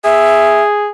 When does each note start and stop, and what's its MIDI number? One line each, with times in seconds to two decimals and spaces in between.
0.04 0.88 68
0.04 0.60 76